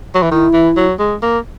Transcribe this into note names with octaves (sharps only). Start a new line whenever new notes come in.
F#3
E3
D#3 E4
E3
F#3
G#3
A#3